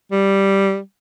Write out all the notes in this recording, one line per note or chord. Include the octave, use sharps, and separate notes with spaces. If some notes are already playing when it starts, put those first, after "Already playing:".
G3